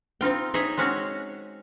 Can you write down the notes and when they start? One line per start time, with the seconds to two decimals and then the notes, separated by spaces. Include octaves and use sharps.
0.21 C4 D#4 F4 G5
0.54 D#4 G#4 C#5 D#5 E5
0.77 G#3 C4 C#4 F#4 G#4 C#5